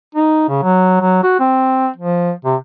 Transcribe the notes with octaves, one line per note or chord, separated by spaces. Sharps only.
D#4
C#3
F#3
F#3
F#4
C4
F3
C3